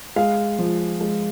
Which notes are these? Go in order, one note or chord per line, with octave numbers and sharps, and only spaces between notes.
G#3 F5
F3
G#3